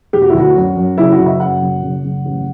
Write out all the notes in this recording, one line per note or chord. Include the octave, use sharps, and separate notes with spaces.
E1 G4
F#4
E4
D2 F#4
F#2
F#2
F#1 E4
F#4
F#1
E5
F#2 F#5
F#1
F#1
F#1
A1